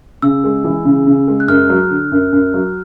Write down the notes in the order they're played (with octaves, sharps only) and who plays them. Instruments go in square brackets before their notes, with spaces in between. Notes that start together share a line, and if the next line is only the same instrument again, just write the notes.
[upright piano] C#3 [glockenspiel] E6
[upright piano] G#3
E3
C#3
C#3
G#3
[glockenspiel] F#6
[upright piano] F#2 [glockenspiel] F6
[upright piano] F#3
D3
F#2
F#2
F#3